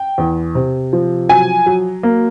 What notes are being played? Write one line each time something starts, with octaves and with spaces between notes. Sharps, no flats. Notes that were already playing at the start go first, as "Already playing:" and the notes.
Already playing: G5
E2
C3
F3
F#3 G#5
F#3
A#3